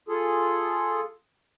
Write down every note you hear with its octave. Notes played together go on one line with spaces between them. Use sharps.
F4 G#4 A4